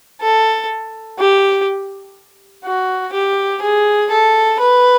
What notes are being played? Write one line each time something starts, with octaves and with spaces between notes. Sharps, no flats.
A4
G4
F#4
G4
G#4
A4
B4